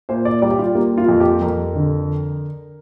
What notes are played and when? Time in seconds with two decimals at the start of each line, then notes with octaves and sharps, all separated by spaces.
0.09 A#2 C5
0.25 D5
0.42 G3 D5
0.51 G4
0.59 F4
0.75 A#3 G4
0.97 F4
1.09 F2
1.20 G4
1.42 F2 A#4
1.75 D3